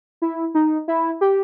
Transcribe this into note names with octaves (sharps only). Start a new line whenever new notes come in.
E4
D#4
E4
G4